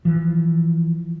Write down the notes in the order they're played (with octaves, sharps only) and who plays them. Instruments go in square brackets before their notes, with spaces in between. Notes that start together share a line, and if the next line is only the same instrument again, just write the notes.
[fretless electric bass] E3 F3